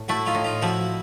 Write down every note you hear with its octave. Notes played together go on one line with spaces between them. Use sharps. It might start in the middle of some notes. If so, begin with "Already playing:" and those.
Already playing: A2
A3 E4 F#4
D#4 F4
A2
D#4 F4
F3 E4 F#4